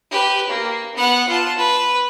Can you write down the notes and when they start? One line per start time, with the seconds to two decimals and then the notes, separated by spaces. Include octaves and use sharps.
0.11 G4 B4
0.49 A#3
0.95 B3 F#5
1.28 F4 A5
1.57 B4